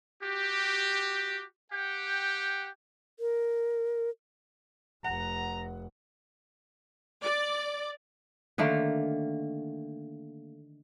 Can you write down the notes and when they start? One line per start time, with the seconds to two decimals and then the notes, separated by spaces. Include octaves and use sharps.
0.23 F#4 G4
1.72 G4 F#5 G5
3.20 A#4
5.04 F1 F#5 A#5
7.22 D5
8.58 D3 D#3 A3 A#3